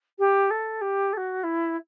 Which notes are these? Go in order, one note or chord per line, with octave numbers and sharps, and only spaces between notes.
G4
A4
G4
A4
F#4
E4